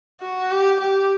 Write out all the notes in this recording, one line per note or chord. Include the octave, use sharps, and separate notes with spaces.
F#4
G4
G4